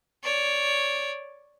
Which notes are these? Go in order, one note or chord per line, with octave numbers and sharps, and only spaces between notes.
C#5 D5